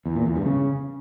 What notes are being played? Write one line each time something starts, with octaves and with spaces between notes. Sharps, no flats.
E2
A#2
E2
G2
C#3